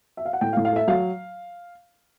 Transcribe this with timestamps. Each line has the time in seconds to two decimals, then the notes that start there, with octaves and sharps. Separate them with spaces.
0.17 E5
0.25 F5
0.33 F#5
0.41 A2 G5
0.53 F5
0.57 A2
0.65 F5
0.73 A3 E5
0.88 F#3 F5